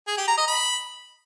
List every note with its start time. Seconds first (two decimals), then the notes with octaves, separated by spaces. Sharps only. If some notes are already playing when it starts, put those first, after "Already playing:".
0.07 G#4
0.17 G4
0.27 A#5
0.38 D#5
0.48 B5